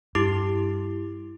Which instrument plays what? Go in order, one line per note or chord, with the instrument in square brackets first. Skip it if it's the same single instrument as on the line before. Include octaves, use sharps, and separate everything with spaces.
[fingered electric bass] G2 [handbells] E4 G4 D6